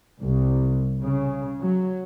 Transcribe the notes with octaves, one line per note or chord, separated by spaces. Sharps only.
C2
C#3
F#3